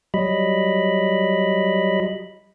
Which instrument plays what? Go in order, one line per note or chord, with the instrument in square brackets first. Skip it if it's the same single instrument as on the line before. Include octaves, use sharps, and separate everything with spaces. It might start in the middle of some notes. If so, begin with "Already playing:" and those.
[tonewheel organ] F#3 G3 D#5 B5